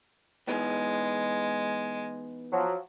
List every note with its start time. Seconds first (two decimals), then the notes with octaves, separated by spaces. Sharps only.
0.47 E3 G#3 B3 D#4
2.52 F3 F#3